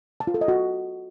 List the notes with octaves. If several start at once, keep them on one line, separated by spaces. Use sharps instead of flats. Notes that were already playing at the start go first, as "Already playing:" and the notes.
A5
F4
A4
D#5
F#4